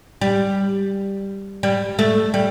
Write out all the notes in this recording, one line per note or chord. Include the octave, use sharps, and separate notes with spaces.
G3
G3
A3
G3